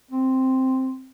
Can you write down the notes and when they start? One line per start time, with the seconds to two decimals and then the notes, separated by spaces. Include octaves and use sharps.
0.11 C4